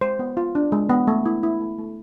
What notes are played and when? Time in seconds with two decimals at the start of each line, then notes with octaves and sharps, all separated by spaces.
0.01 G#3 C5
0.19 B3
0.37 F4
0.55 D4
0.72 G#3
0.89 B3
1.07 A3
1.26 E4
1.43 E4
1.61 A3
1.78 A3